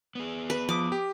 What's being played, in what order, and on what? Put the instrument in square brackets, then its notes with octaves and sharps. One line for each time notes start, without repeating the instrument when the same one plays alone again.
[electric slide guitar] B3 G#4
[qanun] B4
[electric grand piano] F3 D#6 [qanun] D6
[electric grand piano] G4